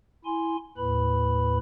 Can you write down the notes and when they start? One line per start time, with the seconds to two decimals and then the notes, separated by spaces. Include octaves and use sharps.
0.25 E4 G#5 C6
0.77 D#2 A2 B4 B5